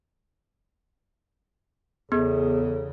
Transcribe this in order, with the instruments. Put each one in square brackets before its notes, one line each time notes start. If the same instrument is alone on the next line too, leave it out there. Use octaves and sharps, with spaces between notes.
[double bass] E2 C#3 [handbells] B3 [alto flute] G#4 [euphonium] A4